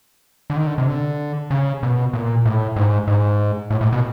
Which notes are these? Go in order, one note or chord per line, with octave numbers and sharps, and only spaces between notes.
D3
D#3
D3
C3
D3
C#3
B2
A#2
A2
G#2
G#2
A2
A2
B2